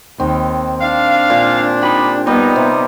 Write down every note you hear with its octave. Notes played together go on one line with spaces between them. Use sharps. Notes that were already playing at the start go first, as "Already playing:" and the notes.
D#2 D#3 C4
D4 F5
A#2
D#4 G4 B5
G3 B3 D#4
C3